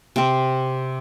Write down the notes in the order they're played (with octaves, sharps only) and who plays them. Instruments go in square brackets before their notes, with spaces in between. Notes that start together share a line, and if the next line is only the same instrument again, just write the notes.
[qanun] C3 C4